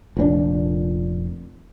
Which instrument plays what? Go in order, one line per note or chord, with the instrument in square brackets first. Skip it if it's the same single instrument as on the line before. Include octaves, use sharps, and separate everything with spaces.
[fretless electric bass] F1 A#2 C4 D4